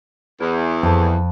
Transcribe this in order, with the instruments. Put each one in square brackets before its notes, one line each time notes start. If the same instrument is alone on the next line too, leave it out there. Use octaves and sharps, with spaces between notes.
[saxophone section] E2
[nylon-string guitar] F2 A5